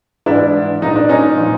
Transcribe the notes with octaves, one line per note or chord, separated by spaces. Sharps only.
G#2 E3 D4 E4
A#2 F3 D#4
D4
C#4 D#4
A#2 F3